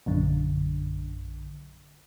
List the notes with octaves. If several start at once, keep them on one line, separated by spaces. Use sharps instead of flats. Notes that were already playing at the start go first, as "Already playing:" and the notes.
A#1 F#2 D3